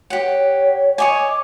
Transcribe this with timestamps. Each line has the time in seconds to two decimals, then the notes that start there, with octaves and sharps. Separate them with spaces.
0.10 G4 C#5 F#5
0.98 C#5 D#5 G#5 D6